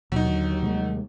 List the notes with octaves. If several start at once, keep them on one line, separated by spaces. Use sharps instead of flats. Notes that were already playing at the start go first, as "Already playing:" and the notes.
D#2 B2 F#3 D#4
D3
C3 G3 G#3